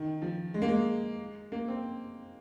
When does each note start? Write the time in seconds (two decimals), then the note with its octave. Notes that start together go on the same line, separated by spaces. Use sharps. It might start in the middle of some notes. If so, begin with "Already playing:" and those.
Already playing: D#3
0.22 F3
0.54 G#3
0.62 A#3
0.68 G#3
1.52 A#3
1.68 C4